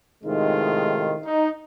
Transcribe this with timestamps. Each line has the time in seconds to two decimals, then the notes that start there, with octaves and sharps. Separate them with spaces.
0.24 A2 C3 D#3 G#3 D#4 F4
1.23 D#4